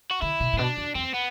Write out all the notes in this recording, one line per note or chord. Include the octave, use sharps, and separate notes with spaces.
F#4
D3 E4
B2
A2
B2 D4
E2
E2 C4
B3